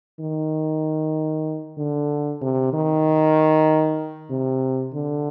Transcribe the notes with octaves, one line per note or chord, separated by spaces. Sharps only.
D#3
D3
C3
D#3
C3
D3